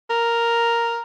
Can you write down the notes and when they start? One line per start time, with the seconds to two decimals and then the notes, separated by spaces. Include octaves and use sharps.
0.10 A#4